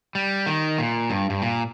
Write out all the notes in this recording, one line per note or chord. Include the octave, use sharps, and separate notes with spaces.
G3
D#3
A#2
G2
G2
A#2